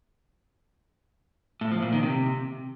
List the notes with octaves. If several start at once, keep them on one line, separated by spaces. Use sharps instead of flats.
A2
F3
A#2
D#3
C3